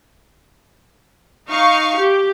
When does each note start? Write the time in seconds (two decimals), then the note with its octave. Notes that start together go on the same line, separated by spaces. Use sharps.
1.50 D#4 F5 C#6
1.99 G4